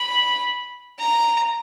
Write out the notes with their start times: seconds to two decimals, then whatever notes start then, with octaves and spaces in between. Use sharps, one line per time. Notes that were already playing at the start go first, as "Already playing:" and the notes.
Already playing: B5
0.99 A#5